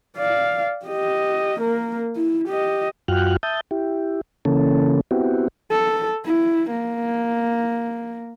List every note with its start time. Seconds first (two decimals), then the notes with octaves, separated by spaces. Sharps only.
0.17 D5 F5
0.86 G4 D#5
1.60 A#3 A#4
2.16 E4
2.48 G4 D#5
3.08 F#2 F4 F#4 G5 F6 F#6
3.43 E5 A5 D#6 G6
3.71 E4 G4
4.45 C#3 E3 A#3 C#4 A4
5.11 B3 C4 E4 F#4 G4
5.71 A4
6.25 E4
6.70 A#3